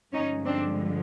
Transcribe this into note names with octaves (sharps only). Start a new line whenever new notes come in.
G2 D3 F3 G#3 C#4 D#4
C4 D4